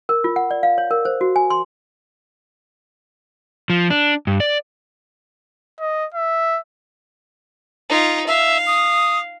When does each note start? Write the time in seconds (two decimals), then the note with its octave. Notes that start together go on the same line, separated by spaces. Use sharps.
0.09 A#4
0.24 F4
0.36 F#5
0.51 D5
0.63 F5
0.78 C#5
0.91 A#4
1.05 C5
1.21 F#4
1.36 G#5
1.50 C6
3.70 F3
3.90 D4
4.27 G2
4.40 D5
5.80 D#5
6.14 E5
7.89 D#4 F4
8.27 E5 F5
8.67 D#6